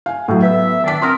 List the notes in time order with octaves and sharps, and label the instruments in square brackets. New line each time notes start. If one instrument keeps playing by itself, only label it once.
[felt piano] F5 G#5
A2 F#3
[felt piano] B3 [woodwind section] E5
[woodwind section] D#3 D4 [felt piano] D6 B6
[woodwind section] C4 A#4 [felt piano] C6 D#6 F6